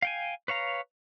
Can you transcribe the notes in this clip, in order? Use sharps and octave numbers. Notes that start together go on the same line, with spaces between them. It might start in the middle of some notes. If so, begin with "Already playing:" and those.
F5 G5 G#5
B4 C#5 F5 A#5